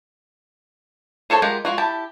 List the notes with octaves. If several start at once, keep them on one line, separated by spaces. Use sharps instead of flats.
G#4 A4 C5 C#5 A5
G#3 F4 G4 A#4 F#5
G#3 F4 F#4
E4 G4 A5